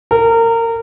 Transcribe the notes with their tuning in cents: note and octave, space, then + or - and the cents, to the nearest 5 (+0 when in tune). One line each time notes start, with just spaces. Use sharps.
A#4 -25